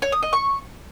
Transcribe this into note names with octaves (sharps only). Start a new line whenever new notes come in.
C#5
D#6
D#5
C#6